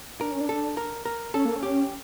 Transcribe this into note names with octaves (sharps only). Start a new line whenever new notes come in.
D4 A#4
C#4
D4
A4
A#4
A#4
C#4 A4
A#3
C#4
G4